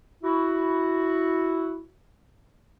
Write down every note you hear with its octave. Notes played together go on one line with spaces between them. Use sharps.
E4 F#4